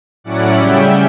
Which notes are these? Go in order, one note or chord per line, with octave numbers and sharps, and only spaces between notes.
A2 F#3 C#4 E4 D5 F#5
C#3 G3 C#4 E5 G5